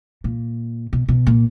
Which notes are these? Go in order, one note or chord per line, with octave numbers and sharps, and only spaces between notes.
A#2
B2
B2
A#2